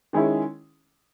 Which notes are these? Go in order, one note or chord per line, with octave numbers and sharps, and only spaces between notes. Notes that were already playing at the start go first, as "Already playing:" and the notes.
D#3 G#3 C#4 E4